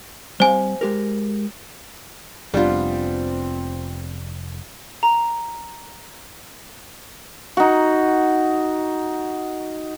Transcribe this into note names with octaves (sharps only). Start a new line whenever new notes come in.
G3 C4 C5 F5 G#5
G#3 G4 A#4
F1 G3 B3 C4 D4 F4
A#5
D#4 F#4